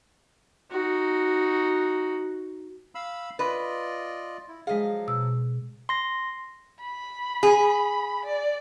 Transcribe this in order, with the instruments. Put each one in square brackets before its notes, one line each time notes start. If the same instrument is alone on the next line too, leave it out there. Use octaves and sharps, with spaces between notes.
[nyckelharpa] D#4 F#4
[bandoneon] F5 B5 E6
[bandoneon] F4 D5 D#5 [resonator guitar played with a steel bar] B4
[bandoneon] E4
[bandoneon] F3 F#3 [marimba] G#3 G#4 [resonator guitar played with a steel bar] D#5 F5
[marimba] B2 E6
[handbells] C6 A#6
[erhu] B5
[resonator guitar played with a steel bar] G#4
[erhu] D5